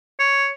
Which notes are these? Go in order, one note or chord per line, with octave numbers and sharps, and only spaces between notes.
C#5